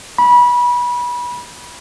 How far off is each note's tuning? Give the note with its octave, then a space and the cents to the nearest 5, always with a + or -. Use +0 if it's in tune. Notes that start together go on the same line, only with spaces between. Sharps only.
B5 -25